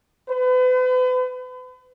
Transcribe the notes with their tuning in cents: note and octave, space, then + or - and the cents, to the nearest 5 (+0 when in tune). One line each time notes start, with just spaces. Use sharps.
B4 +40